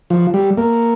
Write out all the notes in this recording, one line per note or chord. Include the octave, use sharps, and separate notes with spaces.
F3
G3
A#3